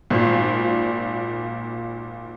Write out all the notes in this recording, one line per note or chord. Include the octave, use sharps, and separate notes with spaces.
G#1 A#2